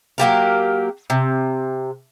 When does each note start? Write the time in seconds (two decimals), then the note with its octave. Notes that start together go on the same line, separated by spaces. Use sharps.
0.18 F#3 A#3 G4 A#4
1.10 C3